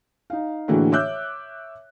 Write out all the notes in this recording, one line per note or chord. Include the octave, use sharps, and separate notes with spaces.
D#4 F5
A2 D3 E3 A#3 F#4 G#4
C#5 E5 D6 E6 F#6 G6